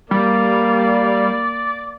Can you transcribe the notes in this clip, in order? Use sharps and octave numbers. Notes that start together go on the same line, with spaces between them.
G3 A#3 D5 F5